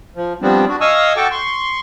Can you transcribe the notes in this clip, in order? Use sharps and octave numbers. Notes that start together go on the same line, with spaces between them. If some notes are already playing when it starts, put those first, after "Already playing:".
F3
F3 G3 B3 C4 D4
D4 F#4
D#5 F5 G#5 C#6 D#6 E6
F#4 A4 G5 A5 C#6 D6
C6 C#6